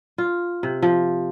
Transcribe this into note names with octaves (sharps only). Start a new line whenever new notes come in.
F4
C3
F3